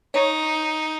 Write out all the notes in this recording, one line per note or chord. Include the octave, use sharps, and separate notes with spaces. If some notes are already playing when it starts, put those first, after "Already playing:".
D#4 C#5